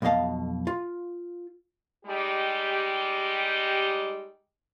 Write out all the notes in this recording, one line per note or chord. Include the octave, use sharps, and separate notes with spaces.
B1 F2 B2 D#5 F5 A5
F4
G3 G#3 D#4 G4